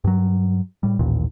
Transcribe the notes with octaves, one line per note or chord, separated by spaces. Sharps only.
G2 F#3
A2 G3
A1 D#2 A#2